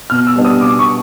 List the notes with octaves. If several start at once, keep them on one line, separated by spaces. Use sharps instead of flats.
B2 F6
E6
G3 B3 D4
D#6
B2 D6
C#6